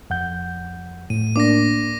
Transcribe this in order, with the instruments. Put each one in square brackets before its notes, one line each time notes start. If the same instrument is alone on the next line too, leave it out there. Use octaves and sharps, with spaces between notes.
[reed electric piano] F2 F#5 G6
[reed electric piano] A2 [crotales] D#7
[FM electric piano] A#3 D4 [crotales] D6 A#6